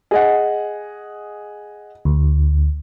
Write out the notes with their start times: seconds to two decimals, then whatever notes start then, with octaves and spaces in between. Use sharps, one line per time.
0.11 G#4 D#5 F#5
2.05 D2